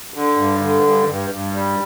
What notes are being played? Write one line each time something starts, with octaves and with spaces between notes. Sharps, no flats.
D3
G2
D3
G2
G2
G2
G3